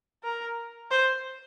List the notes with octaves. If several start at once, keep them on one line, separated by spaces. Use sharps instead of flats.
A#4
C5